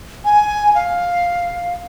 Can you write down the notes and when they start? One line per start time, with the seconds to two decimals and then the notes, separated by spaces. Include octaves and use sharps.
0.25 G#5
0.75 F5